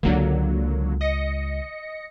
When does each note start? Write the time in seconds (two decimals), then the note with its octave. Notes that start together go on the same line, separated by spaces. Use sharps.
0.03 C#2 D3 F#3 G#3 A#3
1.01 D#5 A#6 C#7